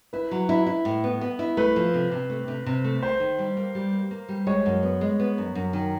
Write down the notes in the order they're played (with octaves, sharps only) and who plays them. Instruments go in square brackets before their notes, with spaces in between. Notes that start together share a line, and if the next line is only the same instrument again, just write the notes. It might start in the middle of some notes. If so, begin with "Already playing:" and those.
[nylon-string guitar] E4 [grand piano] B4
[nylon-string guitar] F#3
E4
E4
A2
B3
B3
E4
[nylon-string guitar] A3 [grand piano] B4
[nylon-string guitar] F3
C3
C3
A3
C3
C3
A3
[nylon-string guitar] A#3 [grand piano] C5
[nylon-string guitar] D#3
G3
A#3
G3
A#3
A#3
G3
[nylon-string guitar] G#3 [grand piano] C#5
[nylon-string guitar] F#2
B3
G#3
B3
F#2
F#2
D#3